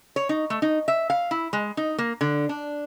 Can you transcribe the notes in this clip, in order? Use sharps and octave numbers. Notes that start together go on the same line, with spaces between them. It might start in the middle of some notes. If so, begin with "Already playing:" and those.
C#5
D#4
A3
D#4
E5
F5
E4
G#3
D#4
A#3
D3
D4